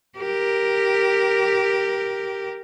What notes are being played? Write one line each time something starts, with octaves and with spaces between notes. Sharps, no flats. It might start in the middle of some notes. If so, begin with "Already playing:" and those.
G4 A#4